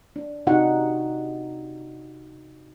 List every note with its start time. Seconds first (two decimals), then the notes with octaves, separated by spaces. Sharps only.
0.16 D4
0.47 C3 D#4 F#4 F#5